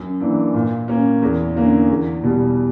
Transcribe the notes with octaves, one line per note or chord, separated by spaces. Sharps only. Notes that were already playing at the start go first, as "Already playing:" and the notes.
Already playing: F#2
E3 A#3 D4
A#2
A#3 C#4
E2
D3 A#3 C#4
E2
B2 G3